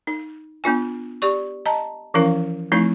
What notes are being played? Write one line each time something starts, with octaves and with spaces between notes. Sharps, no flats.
D#4
B3 D4 F4 G#5
G4 D5 C#6
D#5 A5 A#5
E3 F3 C#4 E4 A#4 F5
F3 A3 C4 D#4 E4